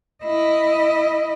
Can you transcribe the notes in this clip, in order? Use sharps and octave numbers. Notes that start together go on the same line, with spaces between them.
E4 D#5